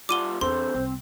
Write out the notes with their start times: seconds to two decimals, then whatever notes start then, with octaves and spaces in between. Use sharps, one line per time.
0.09 G3 F4 F#5 D6 D#7 G7
0.41 E2 C4 D4 A4 C5 C6
0.74 C2 C4